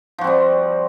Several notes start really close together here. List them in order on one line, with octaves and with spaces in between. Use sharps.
F3 F#4 C4 G3